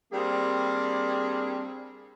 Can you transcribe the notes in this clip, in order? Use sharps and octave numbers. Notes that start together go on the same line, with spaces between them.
G3 A#3 C4 D4 G#4